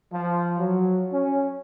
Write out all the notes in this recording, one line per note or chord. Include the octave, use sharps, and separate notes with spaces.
F3
F#3
C#4